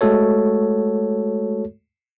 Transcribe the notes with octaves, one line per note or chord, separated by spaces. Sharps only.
G#3 A3 F#4 A4 C#5